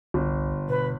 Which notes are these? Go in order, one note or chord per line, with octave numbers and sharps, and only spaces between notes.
G1 C2
B2 B4